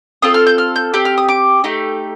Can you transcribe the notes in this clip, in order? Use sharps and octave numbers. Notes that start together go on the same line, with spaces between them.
C4 F4 A4 D#6
F6
G6
F6
G6
C4 G4 G6
F6
D#6
D6
A3 D#4 G4